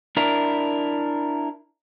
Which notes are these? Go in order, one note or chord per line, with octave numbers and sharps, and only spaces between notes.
D4 E4 A#4